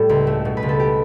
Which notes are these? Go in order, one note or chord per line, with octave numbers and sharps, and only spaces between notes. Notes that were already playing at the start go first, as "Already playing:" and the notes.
Already playing: A2 G3 G4 A4
C#2
A3
B2
B4
C#2
A4
G4